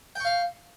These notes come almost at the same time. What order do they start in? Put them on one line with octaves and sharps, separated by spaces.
G5 C#6 F5